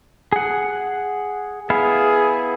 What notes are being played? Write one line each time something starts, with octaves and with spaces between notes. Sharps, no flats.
G#4 F#5
B3 E4 G#4 F5